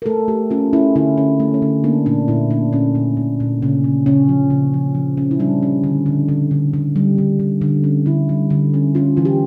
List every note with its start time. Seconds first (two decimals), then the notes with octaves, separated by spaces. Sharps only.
0.02 A#4
0.06 A3 A4
0.28 A3 G4
0.51 C#4 F4
0.73 C#4 E4
0.96 D3 E4
1.18 C#4
1.40 A3
1.54 C#4
1.62 D3
1.84 A#3 D4
2.06 A#2 D4
2.28 A#2 E4
2.50 A#3 D4
2.73 A#2 C#4
2.95 A#2
3.17 A#2
3.40 A#2
3.62 C#3 C#4
3.84 C#3
4.06 C#3 C#4
4.29 F3
4.50 C#3
4.74 F3
4.95 F3
5.17 C#4
5.31 E4
5.40 G3 D4
5.63 C#4
5.84 D3
6.06 D3
6.28 D3
6.51 D3
6.74 D3
6.96 G3
7.18 D3
7.40 D3
7.61 D3
7.84 C#4
8.06 D3 E4
8.29 G3
8.50 D3
8.74 C#4
8.95 C#4 F4
9.17 E3 F4
9.25 G4